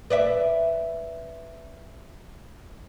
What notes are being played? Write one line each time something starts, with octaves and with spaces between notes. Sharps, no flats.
B4 D5 E5